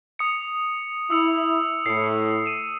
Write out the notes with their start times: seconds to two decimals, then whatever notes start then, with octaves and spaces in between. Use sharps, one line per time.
0.19 D#6 C#7
1.10 E4 D#6 E6 C#7
1.86 A2 C7 C#7
2.46 D#7 E7